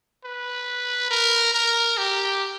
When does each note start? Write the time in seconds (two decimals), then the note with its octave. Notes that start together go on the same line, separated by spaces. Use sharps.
0.24 B4
1.11 A#4
1.54 A#4
1.97 G4